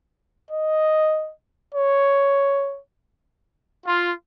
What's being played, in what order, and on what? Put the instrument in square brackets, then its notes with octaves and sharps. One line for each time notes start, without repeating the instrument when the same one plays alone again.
[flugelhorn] D#5
C#5
[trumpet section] F4